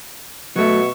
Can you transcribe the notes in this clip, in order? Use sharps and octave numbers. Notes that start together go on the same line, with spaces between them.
B2 F#3 A3 E5 C#6